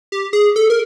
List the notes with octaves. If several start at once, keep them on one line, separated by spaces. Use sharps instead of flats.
G4
G#4
A4
A#4